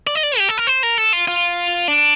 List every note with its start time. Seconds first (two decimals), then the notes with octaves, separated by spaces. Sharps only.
0.07 D5
0.15 D#5
0.23 D5
0.38 G4
0.49 A4
0.58 A#4
0.67 C5
0.83 A#4
0.98 A4
1.13 F4
1.28 F4
1.88 D4